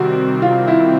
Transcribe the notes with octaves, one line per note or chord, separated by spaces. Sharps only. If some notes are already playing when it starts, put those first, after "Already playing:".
Already playing: C3 D#3 G3 C4 F#4
F4
E4